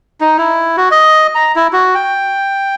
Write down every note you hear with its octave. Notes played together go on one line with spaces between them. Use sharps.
D#4
E4
F#4
D#5
A#5
E4
F#4
G5